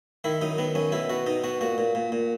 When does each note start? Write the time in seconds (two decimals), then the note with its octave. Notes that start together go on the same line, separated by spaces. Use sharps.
0.24 D#3 E4
0.41 F#2 D#4
0.58 D#3 B3
0.75 F#2 C#4
0.92 B2 E4
1.09 B2 F#4
1.26 B2 D#4
1.44 B2 F#4
1.61 A#2 F#4
1.78 A#2
1.95 A#2
2.12 A#2